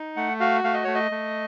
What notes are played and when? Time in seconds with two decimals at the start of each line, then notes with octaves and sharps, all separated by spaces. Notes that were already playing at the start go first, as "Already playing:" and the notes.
Already playing: D#4
0.16 A3 F#5
0.40 F#4 F5
0.64 A3 F5
0.74 D#5
0.84 A3 C#5
0.95 D#5
1.11 A3